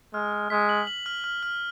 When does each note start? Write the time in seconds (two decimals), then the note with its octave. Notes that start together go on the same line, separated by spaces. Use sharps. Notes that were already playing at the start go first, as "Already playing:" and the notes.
0.14 G#3 F6
0.32 F6
0.50 G#3 B6
0.69 F#7
0.87 F#7
1.06 F6
1.24 F6
1.43 F6